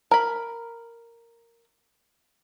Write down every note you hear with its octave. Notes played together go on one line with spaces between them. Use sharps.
A#4 B5